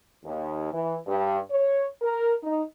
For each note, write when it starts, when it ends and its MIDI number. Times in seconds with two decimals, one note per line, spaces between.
0.24 0.68 39
0.72 0.95 52
1.06 1.38 43
1.50 1.83 73
2.02 2.33 70
2.43 2.61 63